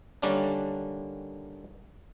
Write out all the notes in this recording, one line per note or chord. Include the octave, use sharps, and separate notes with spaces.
D3 D#3 G3 A#3 C#4 D4